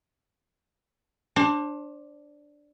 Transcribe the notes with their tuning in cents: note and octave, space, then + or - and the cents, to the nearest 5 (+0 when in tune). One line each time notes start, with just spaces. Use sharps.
D4 +0 C5 +35